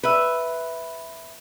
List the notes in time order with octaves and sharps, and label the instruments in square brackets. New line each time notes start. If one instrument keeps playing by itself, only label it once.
[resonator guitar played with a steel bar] B4 E5